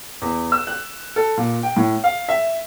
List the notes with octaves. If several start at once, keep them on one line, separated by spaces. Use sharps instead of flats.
E2
E6
F#6
A4
A#2
G5
A2
F5
E5